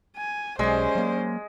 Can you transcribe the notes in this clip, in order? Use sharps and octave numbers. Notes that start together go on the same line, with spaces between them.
G#5
B1 G#3 C#4 C5 D5 G#5 D6
F#3 A#3